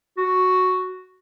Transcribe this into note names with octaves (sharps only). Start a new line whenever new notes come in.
F#4